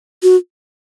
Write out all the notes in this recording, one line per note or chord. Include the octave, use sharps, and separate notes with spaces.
F#4